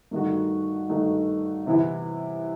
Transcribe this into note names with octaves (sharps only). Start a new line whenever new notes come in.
G2 D#3 A3 D#4 F#4
G2 D#3 A3 D#4 F#4
C3 E3 B3 E4